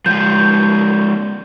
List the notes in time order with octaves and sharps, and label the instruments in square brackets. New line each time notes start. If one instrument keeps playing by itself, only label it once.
[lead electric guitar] F3 G#3 [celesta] G6